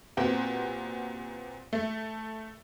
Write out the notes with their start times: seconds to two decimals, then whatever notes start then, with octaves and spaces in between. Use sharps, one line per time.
0.17 A#2 B3 C4 F#4 G4
1.73 A3